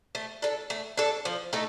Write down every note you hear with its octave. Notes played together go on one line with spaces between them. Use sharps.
A3
D4 A4
A3
D4 A4
F3
A3 D#4 A4